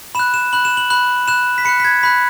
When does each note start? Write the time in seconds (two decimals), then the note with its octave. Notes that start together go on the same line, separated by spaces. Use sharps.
0.15 B5 E7
0.19 F#6
0.34 E7
0.53 B5 F#6 F#7
0.65 E7
0.77 F#7
0.90 B5 F#6 F#7
1.28 B5 F#6 E7
1.58 B6
1.65 B5 C#7
1.69 F#6
1.80 B6
1.85 G#6
2.03 B5 F#6 B6